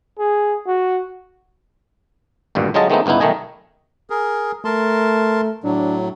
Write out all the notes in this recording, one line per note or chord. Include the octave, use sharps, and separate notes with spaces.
G#4
F#4
G#1 D2 G2 A#2
D3 F#3 G#3 F4 D#5 A5
D#3 G#3 A3 B3 C4 D#4
G1 C#2 B3 D#4 E4
B1 D#3 A3 D#5 G#5
G#4 A#4
A3 A#4 A5 C6
A2 F#3 D4